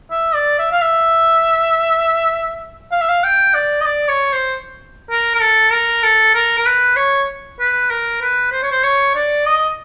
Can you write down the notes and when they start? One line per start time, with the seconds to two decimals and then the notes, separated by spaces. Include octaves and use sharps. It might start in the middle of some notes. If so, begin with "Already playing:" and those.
0.11 E5
0.34 D5
0.59 E5
0.72 F5
0.82 E5
2.92 F5
3.01 E5
3.09 F5
3.24 G5
3.54 D5
3.81 D#5
3.85 D5
4.09 C#5
4.33 C5
5.11 A#4
5.35 A#4
5.41 A4
5.72 A#4
6.03 A4
6.35 A#4
6.58 A#4
6.66 B4
6.96 C#5
7.60 B4
7.90 A#4
8.22 B4
8.52 C5
8.63 C#5
8.72 C5
8.84 C#5
9.15 D5
9.46 D#5